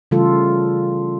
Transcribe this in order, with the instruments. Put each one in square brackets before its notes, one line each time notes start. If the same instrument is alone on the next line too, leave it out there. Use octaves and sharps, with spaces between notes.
[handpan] C#3 E3 G3 A3 F4 A4